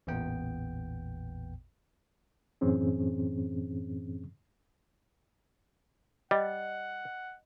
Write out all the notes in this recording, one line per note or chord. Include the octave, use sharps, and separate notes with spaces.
A1 E2 A#2 B3 G5
F#2 A2 E3 C4 C#4 G#4
G3 D#5 F#5